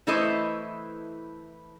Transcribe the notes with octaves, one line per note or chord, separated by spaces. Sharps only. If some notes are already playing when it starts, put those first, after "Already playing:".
E3 A3 E4 A4 C5 D#5